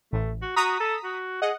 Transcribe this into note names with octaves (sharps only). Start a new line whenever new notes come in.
A1 A3
F#4
F#4 A#5 D#6 B6
A4
F#4
G#4 D#5 F#5